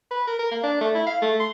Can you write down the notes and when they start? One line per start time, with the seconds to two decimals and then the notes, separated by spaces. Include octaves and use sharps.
0.11 B4
0.27 A#4
0.39 A#4
0.51 A#3
0.63 D4
0.81 A3
0.95 E4
1.07 F5
1.22 A3
1.40 C6